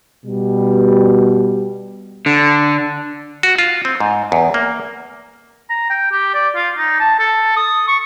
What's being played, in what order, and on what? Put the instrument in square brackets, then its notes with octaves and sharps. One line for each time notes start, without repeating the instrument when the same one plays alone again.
[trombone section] B2 G3
[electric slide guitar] D3
[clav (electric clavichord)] F#4
F4
C4
G#2
E2
A#3
[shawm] A#5
G5
G4
D5
F4
D#4
A5
A4
D#6
C#6